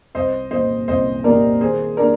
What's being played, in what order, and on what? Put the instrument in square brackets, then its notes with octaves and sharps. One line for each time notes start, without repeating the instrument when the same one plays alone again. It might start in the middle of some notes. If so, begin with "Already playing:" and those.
[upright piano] C2 [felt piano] C5 D#5
[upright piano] A#2 G3 [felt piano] C5 D#5
[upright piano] C2 [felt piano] C5 D#5
[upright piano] A#2 G3 [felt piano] A#4 D5
[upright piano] D#3 [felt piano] G#4 C5
[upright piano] A#3 D4 G4 [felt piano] A#4 D5